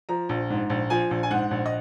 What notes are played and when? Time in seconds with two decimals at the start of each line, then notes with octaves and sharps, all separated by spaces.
0.09 F3 A#5
0.29 A#1
0.50 G#2
0.70 A#1
0.90 F3 G#5
1.11 A#1
1.23 G#5
1.31 G#2 F#5
1.51 A#1
1.66 D#5